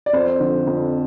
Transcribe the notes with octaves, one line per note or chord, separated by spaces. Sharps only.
D5
F2 C5
D3 F3
F2